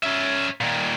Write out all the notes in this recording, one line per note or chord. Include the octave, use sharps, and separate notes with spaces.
C#4 E5
A#2 D#3